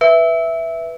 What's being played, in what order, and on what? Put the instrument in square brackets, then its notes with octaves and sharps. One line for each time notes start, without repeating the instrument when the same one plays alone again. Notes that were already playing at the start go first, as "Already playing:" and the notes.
[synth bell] B4 [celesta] E5